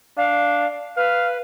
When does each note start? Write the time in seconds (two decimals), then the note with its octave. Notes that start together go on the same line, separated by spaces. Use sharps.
0.17 D4 F5
0.97 B4 F5